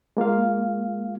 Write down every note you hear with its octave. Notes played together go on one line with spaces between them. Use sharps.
G#3 A#3 F4 F5